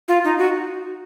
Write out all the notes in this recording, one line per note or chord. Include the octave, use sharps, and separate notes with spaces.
F4
D#4
F#4